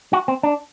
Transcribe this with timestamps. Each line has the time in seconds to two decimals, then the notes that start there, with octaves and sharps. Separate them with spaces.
0.13 F#4
0.28 C4
0.43 D4